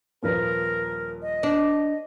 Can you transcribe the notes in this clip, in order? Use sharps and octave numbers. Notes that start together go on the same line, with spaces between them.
D#1 F3 A#4 B4
D#5
D4